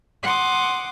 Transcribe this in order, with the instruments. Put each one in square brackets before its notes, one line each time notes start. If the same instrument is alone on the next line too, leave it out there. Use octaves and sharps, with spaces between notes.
[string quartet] F#5 C6 D6 D#6